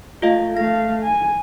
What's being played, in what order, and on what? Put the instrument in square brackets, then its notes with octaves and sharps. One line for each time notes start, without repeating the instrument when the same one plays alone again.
[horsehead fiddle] A3 [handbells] F4 D#5 F5
[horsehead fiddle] A3 F5 [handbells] A#6
[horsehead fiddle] G#5